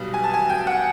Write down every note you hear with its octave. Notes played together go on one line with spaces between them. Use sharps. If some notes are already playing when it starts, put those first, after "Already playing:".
Already playing: B1 B2 G3
G#5
A5
G#5
G5
F#5